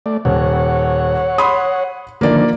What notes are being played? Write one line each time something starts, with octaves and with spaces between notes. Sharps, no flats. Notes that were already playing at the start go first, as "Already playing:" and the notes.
A3 D5
D#1 C#5 F#5
B5 C6 D#6
D3 D#3 F3 A#3 D5